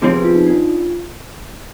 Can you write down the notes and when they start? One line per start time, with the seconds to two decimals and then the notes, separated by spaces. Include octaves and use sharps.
0.02 C3 F3 C4 G#4
0.13 B3 B4
0.24 F4
0.35 D#4
0.46 D4
0.57 F4